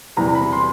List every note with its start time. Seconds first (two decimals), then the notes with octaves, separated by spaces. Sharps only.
0.17 E2 C3 E3 G3 A#5
0.35 B5
0.53 C6